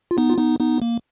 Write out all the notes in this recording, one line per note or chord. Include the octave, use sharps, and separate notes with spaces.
F4
B3 D#4
F4
B3 D#4
B3 D#4
A#3